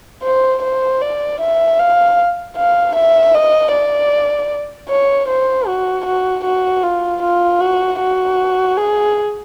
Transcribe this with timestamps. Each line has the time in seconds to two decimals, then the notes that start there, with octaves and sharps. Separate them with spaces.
0.23 C5
0.63 C5
1.01 D5
1.40 E5
1.79 F5
2.57 F5
2.95 E5
3.35 D#5
3.72 D5
4.89 C#5
5.28 C5
5.67 F#4
6.06 F#4
6.44 F#4
6.83 F4
7.22 F4
7.61 F#4
8.00 F#4
8.77 G#4